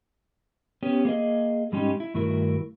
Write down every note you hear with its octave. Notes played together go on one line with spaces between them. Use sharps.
B3 C#4 G4
A#3 G#4 D#5
G#2 G3 G#3 C#4 D#4 G4
E4
G2 D#3 A3 E4 F#4 A#4